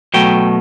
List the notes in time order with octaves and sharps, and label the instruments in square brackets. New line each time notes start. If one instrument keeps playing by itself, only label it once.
[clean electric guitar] B2 F#3 A3 G5